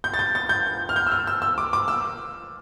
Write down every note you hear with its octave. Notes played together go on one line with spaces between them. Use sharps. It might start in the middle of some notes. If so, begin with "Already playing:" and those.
G6
A6
G6
A6
G6
F6
G6
E6
F6
E6
E6
D6
D6
E6